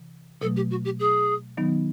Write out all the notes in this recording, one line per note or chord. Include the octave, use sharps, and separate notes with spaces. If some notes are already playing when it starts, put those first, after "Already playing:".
Already playing: C3 E3
B2 F#3 A3 A4
G4
F#4
G4
G#4
D#3 F#3 B3 D#4